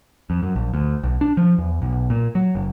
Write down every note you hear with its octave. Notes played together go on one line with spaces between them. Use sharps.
F2
F#2
A#1
D2
B1
D4
F3
E2
B1
A#2
F#3
F#1